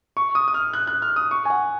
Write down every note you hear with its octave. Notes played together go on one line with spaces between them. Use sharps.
C#6
D#6
D#6
F6
F#6
F#6
F6
D#6
C#6
G#5
F#5